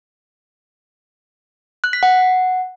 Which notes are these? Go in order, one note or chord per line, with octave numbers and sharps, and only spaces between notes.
F#6
B6
F#5